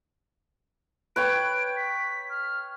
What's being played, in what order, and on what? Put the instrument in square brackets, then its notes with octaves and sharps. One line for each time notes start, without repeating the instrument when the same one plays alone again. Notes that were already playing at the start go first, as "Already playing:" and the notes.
[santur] B4 C#5 G5 [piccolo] D7
[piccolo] B6
F6